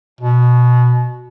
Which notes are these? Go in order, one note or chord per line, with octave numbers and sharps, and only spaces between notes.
B2